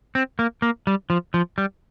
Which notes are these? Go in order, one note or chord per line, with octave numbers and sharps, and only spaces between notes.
C4
A#3
A#3
G3
F3
F3
G3